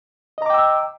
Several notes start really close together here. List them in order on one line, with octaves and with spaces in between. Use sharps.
D#5 A#5 D6 G5 E6